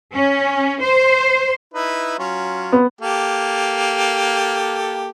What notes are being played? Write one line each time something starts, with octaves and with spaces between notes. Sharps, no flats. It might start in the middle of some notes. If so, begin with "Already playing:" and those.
C#4
C5
D#4 E4 B4
F#3 C#4 F4
B3
A#3 G4 A4